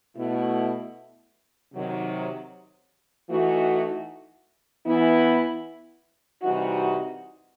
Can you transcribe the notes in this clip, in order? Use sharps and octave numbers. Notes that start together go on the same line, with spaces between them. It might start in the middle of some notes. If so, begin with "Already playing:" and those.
B2 A3 E4
C3 D#3 F#3
E3 A3 D#4 F#4
E3 B3 E4
C3 E3 G3 D#4 F#4